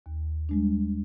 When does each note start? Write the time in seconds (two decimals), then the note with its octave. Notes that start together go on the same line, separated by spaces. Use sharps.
0.06 D#2
0.49 G3 G#3 D4